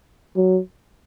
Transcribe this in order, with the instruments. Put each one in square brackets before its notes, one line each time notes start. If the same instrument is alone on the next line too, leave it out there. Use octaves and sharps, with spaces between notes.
[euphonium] F#3